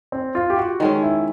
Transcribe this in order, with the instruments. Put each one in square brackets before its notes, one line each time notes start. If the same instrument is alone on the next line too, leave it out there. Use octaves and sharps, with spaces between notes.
[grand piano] C4
F4
G4
F#4
[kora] D#3 G#3 C#4
[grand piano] E4